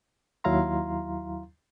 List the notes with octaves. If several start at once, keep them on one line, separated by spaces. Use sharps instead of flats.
D#2 F#3 E4 F5 A#5 C6